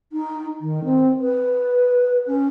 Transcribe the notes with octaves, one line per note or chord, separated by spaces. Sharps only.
D#4
D#3
C4
B4
C#4